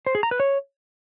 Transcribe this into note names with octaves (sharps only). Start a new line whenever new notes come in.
C5
G#4
A#5
B4
C#5